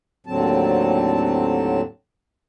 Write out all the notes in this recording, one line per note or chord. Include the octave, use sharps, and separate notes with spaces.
D#2 A2 D3 F#3 C4 A5